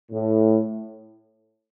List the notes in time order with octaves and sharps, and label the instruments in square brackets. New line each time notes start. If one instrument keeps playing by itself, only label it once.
[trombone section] A2